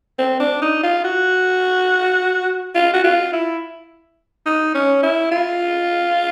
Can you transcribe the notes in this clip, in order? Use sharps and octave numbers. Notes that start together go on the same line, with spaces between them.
C4
D4
D#4
F4
F#4
F4
F#4
F4
E4
D#4
C#4
E4
F4